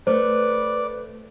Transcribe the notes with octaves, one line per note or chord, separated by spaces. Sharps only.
A3 B4 C5 D5